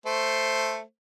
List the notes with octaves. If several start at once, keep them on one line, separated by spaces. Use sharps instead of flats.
A3 C5